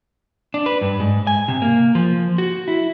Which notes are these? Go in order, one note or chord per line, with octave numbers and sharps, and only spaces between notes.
D4
B4
G2
G#2
G#5
C3
A#3
F3
F#4
E4